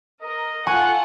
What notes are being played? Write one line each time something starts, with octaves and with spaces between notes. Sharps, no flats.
A#4 D#5
F4 A4 F#5 G#5 C#6 F#6